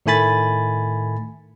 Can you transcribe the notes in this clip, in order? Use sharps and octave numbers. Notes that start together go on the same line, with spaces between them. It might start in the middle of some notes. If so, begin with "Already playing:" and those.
A2 D#3 A3 G#5 B5 A6